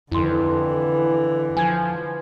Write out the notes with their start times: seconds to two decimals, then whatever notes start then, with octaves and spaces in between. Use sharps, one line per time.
0.11 F2 D3 E3 E4 C6
1.57 F3 G#5 G#6